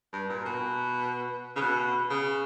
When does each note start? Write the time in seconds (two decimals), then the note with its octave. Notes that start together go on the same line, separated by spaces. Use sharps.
0.13 G2
0.29 A#2
0.46 B2
1.56 C#3
1.61 B2
2.10 C#3